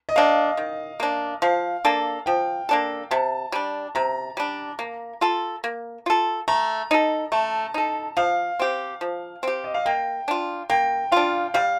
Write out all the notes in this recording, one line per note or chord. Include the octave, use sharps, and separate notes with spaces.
D#5
A#3 D4 F5
D#3
A#3 D4
F3 F5
A#3 D4 A4
F3 G5
A#3 D4 A4
C3 A5
G3 D4
C3 A#5
G3 D4
A#3
F4 A4
A#3
F4 A4
A3 A#5
D#4 A4
A3 A5
D#4 A4
F3 F5
C4 G4
F3
C4 G4
D#5
F5
A#3 G5
D4 F4
A#3 G5
D4 F4 F5
G3 F5